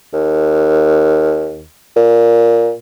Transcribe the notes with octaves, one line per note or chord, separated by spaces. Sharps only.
D#2
A#2